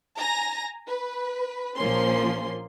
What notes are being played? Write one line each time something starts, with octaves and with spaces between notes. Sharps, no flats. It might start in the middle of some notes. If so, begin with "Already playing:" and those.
G#5 A#5 A#6
B4
A#1 F3 A#3 C#4 C6